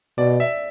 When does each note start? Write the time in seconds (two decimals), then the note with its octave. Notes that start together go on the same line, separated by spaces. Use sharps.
0.18 B2 D5
0.40 E5